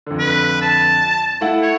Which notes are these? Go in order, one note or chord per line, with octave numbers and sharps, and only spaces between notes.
F2 D3
B4
A5
A3 E4 F#5
C#5